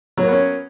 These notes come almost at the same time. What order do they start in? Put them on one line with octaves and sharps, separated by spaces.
F#3 A#3 B3 C#4